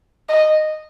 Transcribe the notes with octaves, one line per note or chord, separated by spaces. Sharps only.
D#5